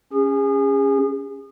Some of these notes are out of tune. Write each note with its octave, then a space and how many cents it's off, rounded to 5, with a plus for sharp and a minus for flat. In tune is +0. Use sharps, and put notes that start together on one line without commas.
C#4 +0 G#4 -35